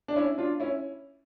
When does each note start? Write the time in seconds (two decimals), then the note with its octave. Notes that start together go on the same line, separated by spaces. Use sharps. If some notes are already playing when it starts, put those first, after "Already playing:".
0.08 D4
0.16 C#4 E4
0.38 D4 F4
0.60 C#4 E4